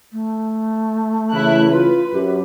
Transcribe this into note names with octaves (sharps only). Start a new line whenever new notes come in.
A3
C#3 E3 E4 F#6
F4 B4
F#2 G4